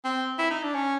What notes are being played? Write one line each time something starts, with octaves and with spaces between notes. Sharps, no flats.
C4
E4
D#4
D4
C#4